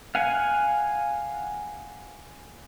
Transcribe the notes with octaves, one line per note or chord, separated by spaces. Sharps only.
F5 F#5 G#5